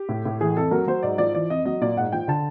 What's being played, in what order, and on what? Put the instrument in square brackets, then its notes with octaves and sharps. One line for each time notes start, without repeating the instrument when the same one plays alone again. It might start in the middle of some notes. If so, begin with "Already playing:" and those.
Already playing: [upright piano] G4
A2
A2
E3 G#4
F2 A4
F#3 A#4
F#3 C5
G#2 D5
F3 D5
E3 D5
F2 D#5
F#3 D#5
A#2 D5
G#2 F#5
F3 G5
D3 A5